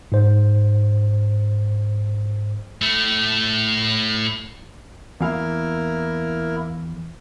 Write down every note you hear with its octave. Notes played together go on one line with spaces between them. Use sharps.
G#2 C5
A2 A3
E2 A#3 E4 A#4 F5